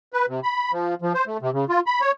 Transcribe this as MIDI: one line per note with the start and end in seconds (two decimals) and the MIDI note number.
0.13 0.26 71
0.28 0.40 48
0.43 0.72 83
0.72 0.95 53
1.02 1.13 53
1.14 1.24 72
1.27 1.37 57
1.42 1.50 48
1.53 1.65 49
1.69 1.80 65
1.86 2.01 83
2.01 2.11 73